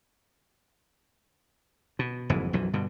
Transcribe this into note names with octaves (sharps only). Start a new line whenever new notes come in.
B2
F#1 F2 G#2 E3
B1 F#2 E3 F3
G2 B2 D3